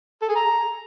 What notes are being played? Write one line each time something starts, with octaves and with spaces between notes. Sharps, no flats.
A4
G#4
A#5